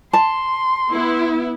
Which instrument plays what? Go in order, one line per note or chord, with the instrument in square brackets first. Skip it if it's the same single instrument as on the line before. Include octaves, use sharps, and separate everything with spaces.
[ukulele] A5 [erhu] C6
[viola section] B3 E4